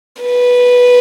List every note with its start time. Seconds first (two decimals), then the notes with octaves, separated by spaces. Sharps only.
0.22 B4